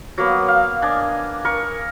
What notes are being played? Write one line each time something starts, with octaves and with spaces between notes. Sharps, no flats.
F#3 A#3 B3
F5
D4 D#5 G#5
A#4 C#6